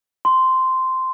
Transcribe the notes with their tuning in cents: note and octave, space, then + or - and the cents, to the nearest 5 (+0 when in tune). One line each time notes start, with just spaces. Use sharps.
C6 -10